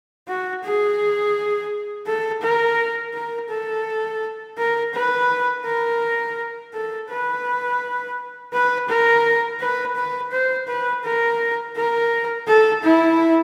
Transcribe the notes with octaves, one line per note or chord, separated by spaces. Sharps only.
F#4
G#4
A4
A#4
A#4
A4
A#4
B4
A#4
A4
B4
B4
A#4
B4
B4
C5
B4
A#4
A#4
A4
E4